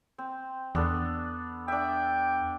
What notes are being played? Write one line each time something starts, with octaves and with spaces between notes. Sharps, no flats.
C4
E2 B3 D4 A4
D4 E5 G5